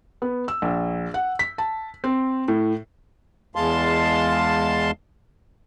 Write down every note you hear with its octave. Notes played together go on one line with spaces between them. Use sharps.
B3
E6
A#1
F#5
B6
A5
C4
A2
E2 G#3 F5 A5 C6